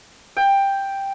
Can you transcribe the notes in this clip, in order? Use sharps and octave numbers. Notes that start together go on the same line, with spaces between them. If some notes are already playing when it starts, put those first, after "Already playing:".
G5